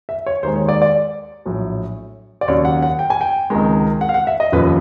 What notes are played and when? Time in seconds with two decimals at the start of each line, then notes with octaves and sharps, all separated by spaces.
0.09 E5
0.26 C#5
0.43 D#2 D#3 G#3 C5
0.56 C#5
0.69 D5
0.82 D5
1.45 A#1 A2 F#3
2.41 D5
2.48 D#2 C#3 F#3 C#5
2.65 F#5
2.82 F#5
2.99 G5
3.10 G#5
3.21 G5
3.50 C#2 C3 D#3 G#3
4.01 F#5
4.09 F5
4.14 F#5
4.27 E5
4.40 D#5
4.52 F1 D#2 C#3 F3 B4